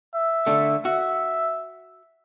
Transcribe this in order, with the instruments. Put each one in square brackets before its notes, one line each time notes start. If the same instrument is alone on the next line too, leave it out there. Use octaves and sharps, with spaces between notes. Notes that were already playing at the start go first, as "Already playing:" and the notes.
[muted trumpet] E5
[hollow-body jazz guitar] D3 A3
[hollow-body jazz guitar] F#4 [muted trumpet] E5